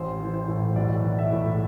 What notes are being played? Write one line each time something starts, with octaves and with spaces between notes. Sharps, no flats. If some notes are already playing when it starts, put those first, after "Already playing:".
Already playing: A1 C5
E3
C5
A2
B1 D5
E3
E5
A2